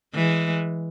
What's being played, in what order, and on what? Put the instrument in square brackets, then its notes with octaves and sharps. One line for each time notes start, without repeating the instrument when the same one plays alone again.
[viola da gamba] E3 G#3